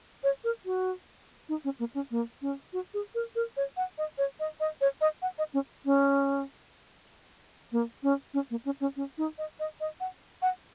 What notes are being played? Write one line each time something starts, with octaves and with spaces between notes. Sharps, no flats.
C#5
A#4
F#4
D#4
C#4
A#3
C#4
A#3
C#4
F#4
G#4
A#4
A#4
C#5
F#5
D#5
C#5
D#5
D#5
C#5
D#5
F#5
D#5
C#4
C#4
A#3
C#4
C#4
A#3
C#4
C#4
C#4
D#4
D#5
D#5
D#5
F#5
F#5